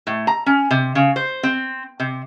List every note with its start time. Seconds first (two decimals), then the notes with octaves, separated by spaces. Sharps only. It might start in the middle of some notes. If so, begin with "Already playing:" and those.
0.07 A2
0.27 A#5
0.46 C#4
0.71 C3
0.95 C#3
1.16 C5
1.43 C4
2.00 C3